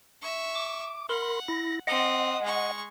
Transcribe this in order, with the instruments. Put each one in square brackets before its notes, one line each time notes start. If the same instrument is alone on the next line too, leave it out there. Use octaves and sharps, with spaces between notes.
[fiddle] E5 C#6
[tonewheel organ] D6
[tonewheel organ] A#4 B5 C6 [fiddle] F#5
[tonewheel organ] E4 A#6
[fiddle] C4 D#6 [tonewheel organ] D#5 F#5
[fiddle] G#3 C#6